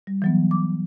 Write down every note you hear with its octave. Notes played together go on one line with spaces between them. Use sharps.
G3
E3 F#3 B3
D6